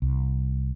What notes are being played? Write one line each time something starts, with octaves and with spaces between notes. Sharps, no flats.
C2